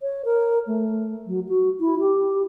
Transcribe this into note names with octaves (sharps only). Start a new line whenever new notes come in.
C#5
A#4
A3
F#3
F#4
E4
G4